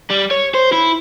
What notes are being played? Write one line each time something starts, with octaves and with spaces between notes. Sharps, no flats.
G3
C#5
C5
E4